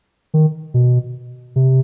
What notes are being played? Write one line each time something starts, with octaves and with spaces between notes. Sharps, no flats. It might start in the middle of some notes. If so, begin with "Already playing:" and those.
D#3
B2
C3